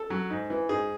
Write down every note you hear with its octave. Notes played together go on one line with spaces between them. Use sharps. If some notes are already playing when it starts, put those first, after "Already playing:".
Already playing: A4
F#3
G#2
E3
G#2 G#4